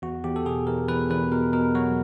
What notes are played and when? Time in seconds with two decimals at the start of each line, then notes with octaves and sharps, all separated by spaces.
0.02 E2 F#4
0.24 E2 G4
0.36 A4
0.46 B2 G#4
0.67 E2 A#4
0.88 E2 B4
1.10 E2 B4
1.31 B2 A#4
1.53 B2 A#4
1.75 F#3 F#4